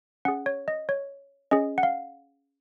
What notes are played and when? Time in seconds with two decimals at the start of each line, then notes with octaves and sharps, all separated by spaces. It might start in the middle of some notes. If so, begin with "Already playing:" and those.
0.25 C#4 G#4 F#5
0.46 C#5
0.68 D#5
0.89 C#5
1.51 C#4 G#4 D#5
1.78 F#5
1.83 F5